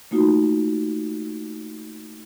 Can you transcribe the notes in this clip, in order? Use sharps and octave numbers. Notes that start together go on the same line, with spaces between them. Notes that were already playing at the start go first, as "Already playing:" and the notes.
A3 A#3 D#4 F4 F#4